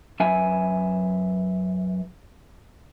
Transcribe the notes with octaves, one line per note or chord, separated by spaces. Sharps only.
F#2 B4 E5 G#5